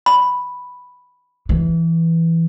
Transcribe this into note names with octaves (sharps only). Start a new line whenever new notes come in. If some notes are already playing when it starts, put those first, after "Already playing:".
B5
E3